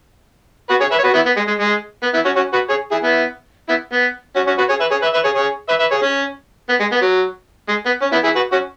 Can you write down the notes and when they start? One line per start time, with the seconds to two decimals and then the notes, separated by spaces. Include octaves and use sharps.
0.69 F#4 B4
0.80 G#4 C#5
0.91 B4 E5
0.98 C#5
1.04 F#4 B4
1.14 B3 E4
1.26 B3
1.37 G#3
1.47 G#3
1.59 G#3
2.03 B3
2.13 B3 E4
2.25 C#4 F#4
2.36 C#4 F#4
2.53 F#4 B4
2.69 G#4 C#5
2.91 E4 G#4
3.02 B3 E4
3.69 B3 E4
3.92 B3
4.36 C#4 F#4
4.47 C#4 F#4
4.58 F#4 B4
4.69 G#4 C#5
4.80 B4 E5
4.91 G#4 C#5
5.02 B4 E5
5.14 B4 E5
5.24 G#4 C#5
5.35 G#4 C#5
5.69 B4 E5
5.80 B4 E5
5.91 G#4 C#5
6.02 C#4
6.69 B3
6.80 G#3
6.92 B3
7.02 F#3
7.68 G#3
7.86 B3
8.02 C#4
8.12 B3 E4
8.24 E4 G#4
8.36 F#4 B4
8.52 C#4 F#4